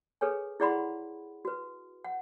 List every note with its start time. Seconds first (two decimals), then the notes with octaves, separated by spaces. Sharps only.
0.21 G#4 A4 B4 C#5 G#5
0.60 E4 G#4 D5 F#5 B5 C6
1.45 F#4 B4
2.04 F#5